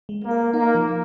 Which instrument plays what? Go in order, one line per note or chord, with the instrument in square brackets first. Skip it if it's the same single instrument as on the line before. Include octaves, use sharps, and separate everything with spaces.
[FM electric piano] G#3
[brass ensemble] A#3
[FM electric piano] A#4
[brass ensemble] A#3 [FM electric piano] D#4
[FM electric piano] F3